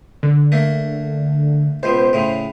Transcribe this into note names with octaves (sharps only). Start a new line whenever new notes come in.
D3
A3 A#3
C#2 B2 C5
A2 C#3